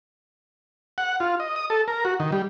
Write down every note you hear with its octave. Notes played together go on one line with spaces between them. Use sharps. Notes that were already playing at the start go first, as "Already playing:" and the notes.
F#5
F4
D#5
D#6
A4
A#4
F#4
D#3
G3